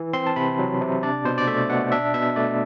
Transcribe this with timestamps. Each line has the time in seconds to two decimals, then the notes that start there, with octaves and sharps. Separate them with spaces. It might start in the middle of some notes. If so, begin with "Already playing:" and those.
Already playing: E3
0.13 C4 C6
0.26 A5
0.36 C3 B5
0.59 F#3
0.81 C3
1.03 D4 D5
1.25 B2 C5
1.38 D5
1.47 A3 E5
1.70 B2 F#5
1.92 D4 E5
2.14 B2 E5
2.36 A3 D5